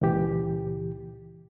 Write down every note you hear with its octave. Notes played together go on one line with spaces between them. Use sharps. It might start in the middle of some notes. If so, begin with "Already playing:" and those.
C#2 A#2 E3 G4